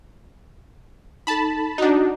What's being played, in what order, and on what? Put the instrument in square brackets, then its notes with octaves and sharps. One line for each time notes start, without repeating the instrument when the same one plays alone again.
[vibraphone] D#4 A4 [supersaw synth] A5 B5
[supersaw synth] D4 D#4 [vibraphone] F#4 F#5